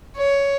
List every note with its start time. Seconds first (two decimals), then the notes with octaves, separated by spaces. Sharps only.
0.16 C#5